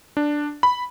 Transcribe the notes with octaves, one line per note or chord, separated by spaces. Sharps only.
D4
B5